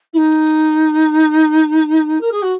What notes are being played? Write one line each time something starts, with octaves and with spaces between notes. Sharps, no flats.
E4
D#4
A#4
G#4
F#4